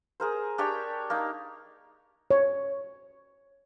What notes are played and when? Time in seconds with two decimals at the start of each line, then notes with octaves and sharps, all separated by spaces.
0.20 G#4 A#4 C5
0.58 D4 G4 C#5 G5
1.10 A#3 D#4
2.31 C#5